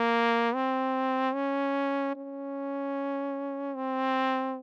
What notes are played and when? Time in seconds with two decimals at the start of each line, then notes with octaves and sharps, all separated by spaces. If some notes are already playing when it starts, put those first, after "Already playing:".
Already playing: A#3
0.55 C4
1.34 C#4
2.16 C#4
3.75 C4